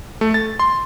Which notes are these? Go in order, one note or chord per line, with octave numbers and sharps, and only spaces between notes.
A3
A6
C6